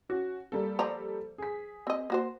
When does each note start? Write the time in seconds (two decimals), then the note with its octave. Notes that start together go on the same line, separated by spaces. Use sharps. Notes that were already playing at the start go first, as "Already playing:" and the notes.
0.09 C#4 F#4
0.52 G3 A#3 A4
0.79 F3 D5 A#5
1.38 G#4 B6
1.87 C4 D#5
2.10 A#3 F#4 C5